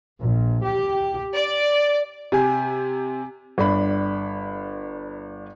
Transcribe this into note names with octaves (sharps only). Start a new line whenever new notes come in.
A#1
G4
D5
C3 G4 G#5
G1 D4 B5